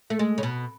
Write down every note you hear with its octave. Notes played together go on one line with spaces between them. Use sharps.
A3
G#3
C#3
B2